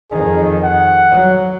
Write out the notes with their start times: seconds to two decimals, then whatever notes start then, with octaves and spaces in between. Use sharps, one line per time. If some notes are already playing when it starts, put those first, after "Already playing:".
0.12 F2 D#3 G#4
0.63 F#5
1.11 F#3